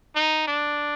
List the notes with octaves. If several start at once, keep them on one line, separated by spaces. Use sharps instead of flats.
D#4
D4